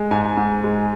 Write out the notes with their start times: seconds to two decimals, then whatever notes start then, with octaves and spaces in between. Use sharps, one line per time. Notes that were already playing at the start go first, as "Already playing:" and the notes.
Already playing: G#3
0.11 G#2 G#5
0.37 G#2
0.64 G#3